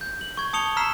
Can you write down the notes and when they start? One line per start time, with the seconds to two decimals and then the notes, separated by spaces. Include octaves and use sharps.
0.01 G6
0.21 F#7
0.37 C#6 G#6
0.53 A5 D#6 C#7 F7 G7
0.76 A#5 E6 F6 B6 C7 E7